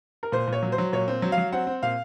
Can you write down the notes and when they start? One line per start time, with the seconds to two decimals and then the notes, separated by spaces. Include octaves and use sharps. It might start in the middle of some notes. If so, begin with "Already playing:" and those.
0.23 A#4
0.32 A#2 C5
0.48 A#2 C#5
0.63 F#3
0.72 C5
0.78 F#3
0.93 A#2 C#5
1.08 C4
1.22 F#3
1.32 F5
1.38 F#3
1.52 C4 F#5
1.67 C4
1.83 A#2 F5